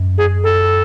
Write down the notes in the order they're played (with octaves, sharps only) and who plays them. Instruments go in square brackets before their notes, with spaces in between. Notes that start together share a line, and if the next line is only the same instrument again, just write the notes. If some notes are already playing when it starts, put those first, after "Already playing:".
Already playing: [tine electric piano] F#2
[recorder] G#4
A4